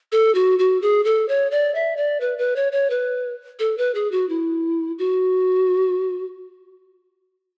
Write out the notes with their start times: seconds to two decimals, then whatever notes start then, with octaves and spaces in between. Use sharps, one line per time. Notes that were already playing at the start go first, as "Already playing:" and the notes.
0.12 A4
0.35 F#4
0.59 F#4
0.82 G#4
1.05 A4
1.29 C#5
1.51 D5
1.75 E5
1.97 D5
2.21 B4
2.38 B4
2.56 C#5
2.72 C#5
2.90 B4
3.59 A4
3.78 B4
3.95 G#4
4.12 F#4
4.29 E4
4.99 F#4